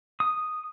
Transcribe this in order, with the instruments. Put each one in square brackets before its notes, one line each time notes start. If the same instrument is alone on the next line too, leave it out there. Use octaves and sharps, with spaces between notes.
[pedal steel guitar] D#6